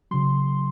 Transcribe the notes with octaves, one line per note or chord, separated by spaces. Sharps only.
C#3 F#3 C6